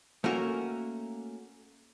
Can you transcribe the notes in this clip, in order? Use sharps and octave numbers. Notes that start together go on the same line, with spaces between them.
A3 A#3 C#4 F#4 A#4